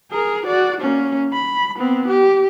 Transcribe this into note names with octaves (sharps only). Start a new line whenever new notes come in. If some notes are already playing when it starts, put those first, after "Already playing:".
G#4 A#4
F#4 D5
A#3 C#4
B5
B3 C4
G4